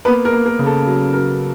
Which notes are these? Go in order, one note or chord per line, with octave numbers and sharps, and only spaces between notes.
A#3 B3 B4
A#4
A#3
A#4
C#3
A4
F#3
F#3 A#4